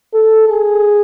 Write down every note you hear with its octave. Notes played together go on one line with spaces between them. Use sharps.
A4
G#4